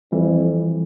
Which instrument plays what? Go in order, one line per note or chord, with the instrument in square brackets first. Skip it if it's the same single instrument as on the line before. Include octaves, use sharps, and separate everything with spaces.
[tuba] F2 [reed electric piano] E3 G3